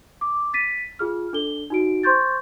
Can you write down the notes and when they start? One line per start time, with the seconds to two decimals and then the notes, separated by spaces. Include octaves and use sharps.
0.21 D6
0.54 A6 B6 D#7
0.99 F4 G#4 F6
1.33 D4 A4 G7
1.70 D#4 F#4 D7
2.03 C5 C6 C#6 G6 A6